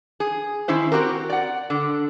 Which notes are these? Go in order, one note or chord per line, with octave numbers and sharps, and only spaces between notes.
G#4
D#3 C#4 E4 C5
C4 F#4 G4 A#4
D5 F#5
D3